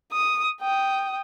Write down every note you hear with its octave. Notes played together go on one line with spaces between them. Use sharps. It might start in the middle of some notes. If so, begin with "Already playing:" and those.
D#6
G5 D#6